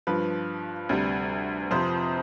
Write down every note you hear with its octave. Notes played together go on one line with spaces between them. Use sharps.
G2 F3 B4
D2 C3 G3
F2 C3 F3 C5